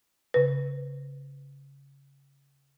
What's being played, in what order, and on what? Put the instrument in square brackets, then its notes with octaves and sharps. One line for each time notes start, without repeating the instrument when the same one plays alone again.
[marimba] C#3 B4